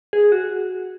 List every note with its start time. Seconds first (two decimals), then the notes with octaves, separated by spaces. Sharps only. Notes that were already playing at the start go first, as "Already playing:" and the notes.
0.13 G#4
0.32 F#4